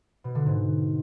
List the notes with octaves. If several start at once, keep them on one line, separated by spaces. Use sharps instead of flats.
B2
D3
G#2